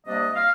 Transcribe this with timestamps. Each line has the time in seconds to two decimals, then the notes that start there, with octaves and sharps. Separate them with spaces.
0.06 C3 G3 A#3 D4 D#5
0.35 F5